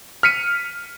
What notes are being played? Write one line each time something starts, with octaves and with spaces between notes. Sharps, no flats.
F6 B6 C#7 D#7